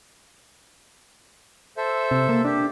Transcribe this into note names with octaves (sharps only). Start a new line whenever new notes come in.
A4 C5 E5
C3
A#3
D4 G4